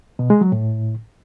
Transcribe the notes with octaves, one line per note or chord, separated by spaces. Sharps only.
B2
G#3
F#3
A2